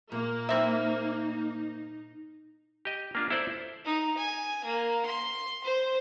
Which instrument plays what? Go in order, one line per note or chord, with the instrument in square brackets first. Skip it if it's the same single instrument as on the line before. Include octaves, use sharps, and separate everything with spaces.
[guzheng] A#2 [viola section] A#3
[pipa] C4 E5 [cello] D#4 [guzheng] E4 C5
[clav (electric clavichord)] G4 D#5
A#3 D4 F4
E4 A4 C5 D5
[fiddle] D#4
G#5
A#3
C6
C5